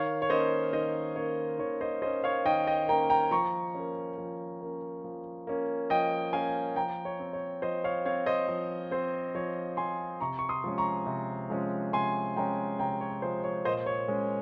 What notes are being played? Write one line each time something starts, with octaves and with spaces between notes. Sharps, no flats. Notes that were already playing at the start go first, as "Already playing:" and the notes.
Already playing: D#3 C#5 F5
C#5
A#3 C#4 C5 D#5
D#3 C5 D#5
A#3 C#4 C#5
D#3 C#5
C5 D#5
A#3 C#4 C5 D#5
C#5 F5
D#3 D#5 G5
D#5 G5
A#3 C#4 G5 A#5
G5 A#5
F3 A#5 C#6
A#3 C#4
F3
A#3 C#4
F3
A#3 C#4
F3 D#5 G5
A#3 C#4 F5 G#5
F3 G5 A#5
C#5
C4
C#5
F3 C5 D#5
C#5 F5
C4 C#5 F5
C5 D#5
F3
C4 C5
F3 C#5
C4 G#5 C6
C3 A#5 C#6
C#6
C6 D#6
F3 G#3 C#4
A#5 C#6
C3
F3 G#3 C#4
C3 G#5 C6
F3 G#3 C#4 G5 A#5
C3 G5 A#5
C#5
F3 G#3 C#4 C5
C#5
A#2 C5 D#5
C#5
G#3 C#4